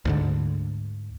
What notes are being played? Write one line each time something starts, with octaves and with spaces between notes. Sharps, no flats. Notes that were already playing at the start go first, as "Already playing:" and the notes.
D2 G#2 D3